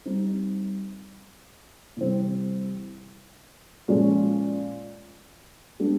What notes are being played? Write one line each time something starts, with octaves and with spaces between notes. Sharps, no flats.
G3 C4 D#4
C3 E3 G3 C4
A#2 F3 G#3 C#4
G#3 B3 D4 G4